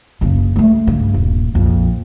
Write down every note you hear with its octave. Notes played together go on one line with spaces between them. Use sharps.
F#1 C#3
G#3 A3
G2 C#3
D#1
A#1 F2